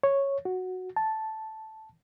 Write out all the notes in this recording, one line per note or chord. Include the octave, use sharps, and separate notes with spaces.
C#5
F#4
A5